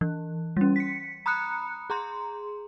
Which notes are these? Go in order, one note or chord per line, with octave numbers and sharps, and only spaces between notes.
E3
G3 C#4
B6 C#7
A#5 B5 D#6 F#6 C#7
G#4 A#5 C6